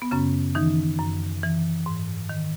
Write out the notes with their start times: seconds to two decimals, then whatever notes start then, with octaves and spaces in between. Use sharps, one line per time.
0.02 B3
0.11 F#2 C#3 C#4
0.55 D#3 E3 D#4
0.99 F#2
1.43 E3
1.86 G#2
2.29 D#3